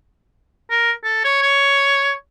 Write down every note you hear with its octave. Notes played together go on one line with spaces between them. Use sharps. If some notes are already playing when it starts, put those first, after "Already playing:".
A#4
A4
C#5
C#5